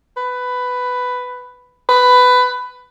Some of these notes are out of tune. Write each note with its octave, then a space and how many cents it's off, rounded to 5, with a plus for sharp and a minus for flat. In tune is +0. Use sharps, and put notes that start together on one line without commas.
B4 +10
B4 +15